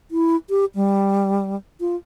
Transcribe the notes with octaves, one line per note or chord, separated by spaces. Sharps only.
E4
G4
G3
F4